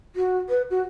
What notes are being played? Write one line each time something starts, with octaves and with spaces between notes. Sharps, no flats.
F#4
B4
F#4